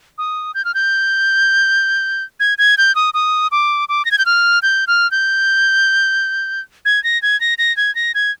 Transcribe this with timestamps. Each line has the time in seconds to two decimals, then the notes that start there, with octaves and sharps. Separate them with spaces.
0.18 D#6
0.55 G6
0.65 F6
0.75 G6
2.40 G#6
2.58 G#6
2.78 G6
2.95 D#6
3.14 D#6
3.52 D6
3.89 D6
4.05 A#6
4.11 G#6
4.18 G6
4.26 F6
4.62 G6
4.87 F6
5.11 G6
6.85 G#6
7.04 A#6
7.22 G#6
7.41 A#6
7.58 A#6
7.77 G#6
7.95 A#6
8.15 G#6